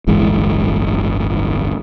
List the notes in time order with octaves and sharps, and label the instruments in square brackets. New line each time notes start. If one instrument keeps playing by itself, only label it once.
[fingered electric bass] D1 G1 E3 G#3